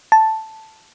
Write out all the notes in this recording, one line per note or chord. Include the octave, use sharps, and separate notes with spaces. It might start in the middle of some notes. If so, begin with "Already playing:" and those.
A5